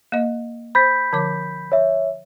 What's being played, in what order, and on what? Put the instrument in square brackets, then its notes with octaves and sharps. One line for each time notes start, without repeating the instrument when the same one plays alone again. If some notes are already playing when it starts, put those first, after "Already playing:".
[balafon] A#3 D#5
[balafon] C5 [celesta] B5 G6 B6
[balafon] D3 F3 D6
[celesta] C#5 E5